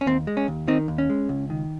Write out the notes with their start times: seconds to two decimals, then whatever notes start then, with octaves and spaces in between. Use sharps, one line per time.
0.01 C#4
0.06 D#2 C4
0.27 G#3
0.37 C#4
0.48 D#2
0.68 D#3 C4 D#4
0.88 D#2
0.98 C#4
1.10 G#3
1.29 C#2
1.50 D#3